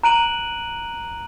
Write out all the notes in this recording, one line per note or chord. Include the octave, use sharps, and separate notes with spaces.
A#5 F#6 D7 D#7 F#7